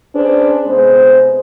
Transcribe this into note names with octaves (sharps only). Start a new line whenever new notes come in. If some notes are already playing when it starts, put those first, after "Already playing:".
C#4 D4 G#4 B4 C5
C3 G#3 B3 C5